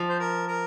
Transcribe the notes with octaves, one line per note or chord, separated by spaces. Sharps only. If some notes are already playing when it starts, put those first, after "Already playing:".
Already playing: F3
C5
A#4
A#4